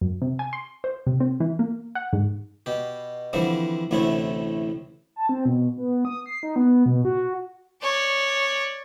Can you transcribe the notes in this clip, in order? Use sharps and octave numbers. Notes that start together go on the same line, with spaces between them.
F#2
C3
G#5
C6
C5
C3
C4
E3
A#3
F#5
G#2
B2 G4
D3 E3 F3 G3 C4
A1 D2 A2 C3 A3 E4
A5
C4
B2
B3
D#6
C7
D#4
B3
B2
F#4
C#5 D5